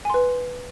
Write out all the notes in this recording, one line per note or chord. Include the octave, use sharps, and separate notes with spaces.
B4 G#5 C6